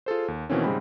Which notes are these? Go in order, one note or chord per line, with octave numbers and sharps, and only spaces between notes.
F4 G#4 A4 C5
D#2
B2 D#3 E3 A#3 C4 C#4
G#2 C#3 G3 G#3 C4 B5